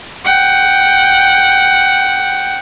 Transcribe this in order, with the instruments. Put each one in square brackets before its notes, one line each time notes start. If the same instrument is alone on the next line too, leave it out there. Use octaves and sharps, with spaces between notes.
[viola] F#5 G5